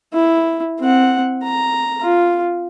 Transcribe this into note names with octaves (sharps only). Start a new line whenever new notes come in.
E4
C4 F#5
A#5
F4